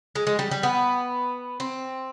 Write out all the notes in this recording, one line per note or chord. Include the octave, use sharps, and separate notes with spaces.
G#3
G#3
G3
G3
B3
C4